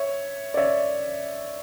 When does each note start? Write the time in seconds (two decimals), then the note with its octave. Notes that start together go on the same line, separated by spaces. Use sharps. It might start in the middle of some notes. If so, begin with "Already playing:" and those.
Already playing: C#5 E5
0.54 D5
0.57 C#5 E5